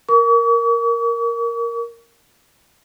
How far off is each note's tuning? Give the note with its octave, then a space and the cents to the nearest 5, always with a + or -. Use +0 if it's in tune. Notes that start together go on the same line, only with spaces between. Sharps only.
A#4 +0 C#6 +45